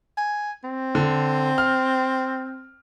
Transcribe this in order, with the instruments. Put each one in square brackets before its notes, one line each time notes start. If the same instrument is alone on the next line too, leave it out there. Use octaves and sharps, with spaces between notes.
[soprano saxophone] G#5
C4
[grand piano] D3
F6